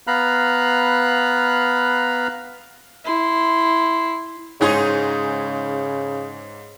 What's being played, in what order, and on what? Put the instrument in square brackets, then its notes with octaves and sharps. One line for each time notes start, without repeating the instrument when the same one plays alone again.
[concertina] B3 F5 A#5 B5 F#6
[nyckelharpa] E4 C6
[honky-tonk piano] G#2 C#5 C6 [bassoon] C#3 [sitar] D#4 G#4